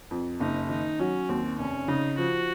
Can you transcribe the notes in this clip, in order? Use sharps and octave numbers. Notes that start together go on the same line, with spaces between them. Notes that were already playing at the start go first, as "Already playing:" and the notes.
F2
F#1 D#4
D#3 D#4
F#3 C#4
D#2 C4
F1 C#4
C#3 D#4
F3 F#4